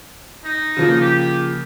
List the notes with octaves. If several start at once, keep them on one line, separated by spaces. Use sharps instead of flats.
D#4
C#3 F3 A#3
G4